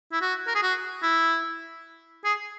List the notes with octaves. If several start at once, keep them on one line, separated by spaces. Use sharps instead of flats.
E4
F#4
A#4
G#4
F#4
E4
G#4